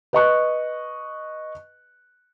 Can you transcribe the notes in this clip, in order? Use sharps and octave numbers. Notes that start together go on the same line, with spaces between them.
B4 D#5 C#6 F#6